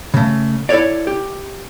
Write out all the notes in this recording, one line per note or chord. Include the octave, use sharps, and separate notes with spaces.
C#3 A3
E4 A4 B4 C#5 D5
G4